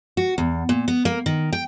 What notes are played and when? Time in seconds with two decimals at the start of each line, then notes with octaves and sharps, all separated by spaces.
0.17 F#4
0.38 E2
0.69 A#2
0.88 B3
1.05 A#3
1.26 D#3
1.53 G5